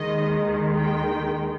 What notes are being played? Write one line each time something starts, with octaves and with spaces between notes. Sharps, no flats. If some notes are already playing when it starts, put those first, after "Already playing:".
Already playing: D#2 D#3 G#3 D#5
G5